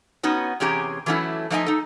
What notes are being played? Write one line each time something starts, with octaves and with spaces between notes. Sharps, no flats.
B3 C#4 D#4 F#4
E2 C3 C#4 G4 G#4 A#5
E3 F#3 A3 C#4 E4
F3 A3 D#4 D5 D#5 G#5
D#4 A4